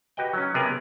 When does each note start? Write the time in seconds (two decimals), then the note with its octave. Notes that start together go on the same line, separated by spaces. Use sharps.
0.17 F#4 G4 B4 D#5 G5
0.33 F#3 C#4
0.54 C3 A#3 B3 G#4 A#4